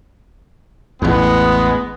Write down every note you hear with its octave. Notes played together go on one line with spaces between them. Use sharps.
A1 E2 G#3 B3